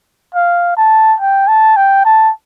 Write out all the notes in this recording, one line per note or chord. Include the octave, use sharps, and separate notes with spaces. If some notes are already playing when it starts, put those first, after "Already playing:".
F5
A5
G5
A5
G5
A5